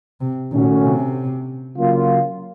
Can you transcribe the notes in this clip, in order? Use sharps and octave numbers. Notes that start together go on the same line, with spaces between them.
C3
A#2 D#3 A3 C#4 F#4
C3
C#3 F#3 A#3 F4